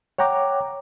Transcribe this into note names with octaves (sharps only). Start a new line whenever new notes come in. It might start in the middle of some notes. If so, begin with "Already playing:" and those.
C#5 F#5 G5 A#5 D6